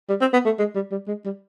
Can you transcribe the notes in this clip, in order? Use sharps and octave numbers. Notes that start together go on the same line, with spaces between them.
G3
C4
B3
A3
G#3
G3
G3
G#3
G3